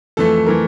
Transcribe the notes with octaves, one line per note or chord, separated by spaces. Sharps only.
F2 E3 A3 A4
E3 A3 A#4